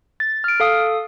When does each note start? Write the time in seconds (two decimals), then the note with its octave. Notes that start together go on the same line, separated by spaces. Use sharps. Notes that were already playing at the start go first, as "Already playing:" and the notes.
0.20 A6
0.44 F6 D7
0.60 A4 F5 D#6